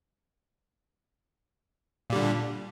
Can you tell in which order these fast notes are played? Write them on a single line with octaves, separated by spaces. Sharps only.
A#2 G3 D3